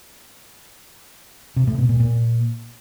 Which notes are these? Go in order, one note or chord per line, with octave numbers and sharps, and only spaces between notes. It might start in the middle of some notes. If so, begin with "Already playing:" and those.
C3
A2
B2
A#2
A#2